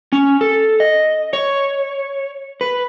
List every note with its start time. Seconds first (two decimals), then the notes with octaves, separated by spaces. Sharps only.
0.12 C#4
0.41 A4
0.80 D#5
1.33 C#5
2.61 B4